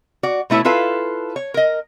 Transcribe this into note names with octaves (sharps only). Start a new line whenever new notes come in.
F#4 D5
B2 A3 E4 B4 C#5
E4 F4 A4 B4 F5
C#5
A#4 D#5